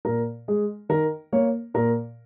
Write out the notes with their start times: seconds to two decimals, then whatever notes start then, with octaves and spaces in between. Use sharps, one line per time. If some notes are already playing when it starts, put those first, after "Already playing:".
0.05 A#2 A#4
0.48 G#3 G#4
0.89 D#3 A#4
1.33 A#3 C#5
1.74 A#2 A#4